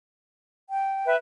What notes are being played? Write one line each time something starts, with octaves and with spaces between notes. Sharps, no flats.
G5
B4 E5